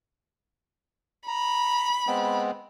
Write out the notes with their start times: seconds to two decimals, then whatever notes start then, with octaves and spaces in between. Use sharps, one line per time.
1.27 A#5 B5
2.07 G#3 B3 C4